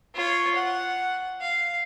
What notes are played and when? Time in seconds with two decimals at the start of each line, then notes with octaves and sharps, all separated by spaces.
0.15 F4 C#5
0.55 F#5
1.41 F5